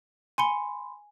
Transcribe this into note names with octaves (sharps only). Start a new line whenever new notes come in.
G#5 B5 C6 C#7 G7